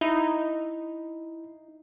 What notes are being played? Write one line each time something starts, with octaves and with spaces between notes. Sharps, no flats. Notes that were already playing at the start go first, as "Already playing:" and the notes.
D#4 E4